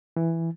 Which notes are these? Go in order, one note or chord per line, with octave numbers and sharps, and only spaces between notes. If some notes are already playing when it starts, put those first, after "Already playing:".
E3